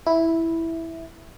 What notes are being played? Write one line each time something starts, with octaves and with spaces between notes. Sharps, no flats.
E4